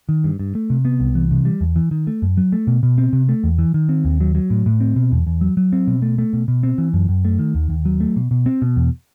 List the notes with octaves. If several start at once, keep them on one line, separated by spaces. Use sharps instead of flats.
D#3
G2
G2
A3
C3
B3
C2
E3
C3
G3
E2
E3
D#3
A3
F#2
F#3
A3
B2
B2
C4
C3
A3
E2
E3
D#3
C4
D#2
F#3
F#3
A2
A2
C4
B2
E2
E2
F#3
F#3
C4
B2
A3
A3
B2
B2
C4
E3
F#2
F#2
A3
D#3
D#2
D#2
F#3
A3
B2
B2
C4
B2
E2